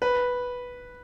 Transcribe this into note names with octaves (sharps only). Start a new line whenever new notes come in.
B4